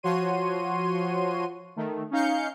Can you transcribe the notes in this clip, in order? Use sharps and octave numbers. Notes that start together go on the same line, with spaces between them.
F3 F#4 C#5 C6 D#7
D#3 A3
C#4 D#4 F5 G6 C#7